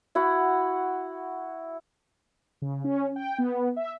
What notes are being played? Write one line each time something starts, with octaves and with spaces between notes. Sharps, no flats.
E4 F#4 F#5
C#3
C#4
G5
B3
E5